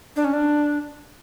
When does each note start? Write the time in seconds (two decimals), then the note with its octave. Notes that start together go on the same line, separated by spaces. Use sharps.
0.16 D4
0.25 C#4
0.33 D4